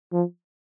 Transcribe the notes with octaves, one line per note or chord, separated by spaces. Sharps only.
F3